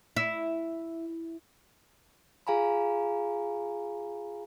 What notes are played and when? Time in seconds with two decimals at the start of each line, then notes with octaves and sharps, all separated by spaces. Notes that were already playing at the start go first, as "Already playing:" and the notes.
0.16 E4
2.47 F4 G#4 F5 G#5 A#5 B5